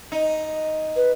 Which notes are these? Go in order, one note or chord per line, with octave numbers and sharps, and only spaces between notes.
D#4
B4